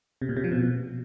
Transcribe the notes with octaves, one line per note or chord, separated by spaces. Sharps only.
C3
A#2
C3
F3
B2